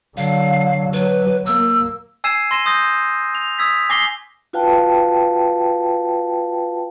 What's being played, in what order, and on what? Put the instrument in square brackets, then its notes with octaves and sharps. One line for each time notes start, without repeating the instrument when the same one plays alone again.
[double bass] D3 F#3 [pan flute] F5
[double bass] F#3 [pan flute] B4
[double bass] A#3 [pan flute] E6
[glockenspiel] G#5 E6 G#6 C7 D#7 E7
C6 A#6 D#7 E7
C6 D#6 G6 A#6 E7
F7
D#6 E6 G#6 B6
G#5 D6 A#6 C7 G7
[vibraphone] F4 F#4 B4 F5 G5 A5